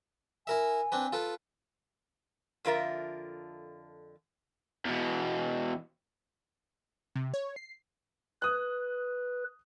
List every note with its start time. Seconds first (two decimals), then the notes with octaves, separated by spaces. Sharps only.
0.47 E4 A#4 E5 G#5
0.92 C4 D4 B4
1.13 F4 A4 B4
2.65 F2 D3 F4 A#4 E5
4.86 E2 B2
7.15 C3
7.34 C#5
7.56 C7
8.42 B4 D#6 F#6